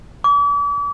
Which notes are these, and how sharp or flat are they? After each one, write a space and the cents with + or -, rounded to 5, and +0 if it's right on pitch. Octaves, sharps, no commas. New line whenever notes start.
D6 -40